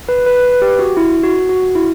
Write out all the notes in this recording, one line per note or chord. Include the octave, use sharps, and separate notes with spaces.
B4
B4
B4
G4
F#4
E4
F#4
F#4
E4